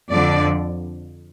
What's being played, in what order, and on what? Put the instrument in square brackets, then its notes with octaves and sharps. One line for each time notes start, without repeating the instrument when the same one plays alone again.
[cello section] F2 D3 F3 D5